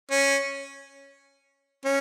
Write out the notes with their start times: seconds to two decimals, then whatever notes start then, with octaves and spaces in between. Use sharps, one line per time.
0.11 C#4
1.85 C#4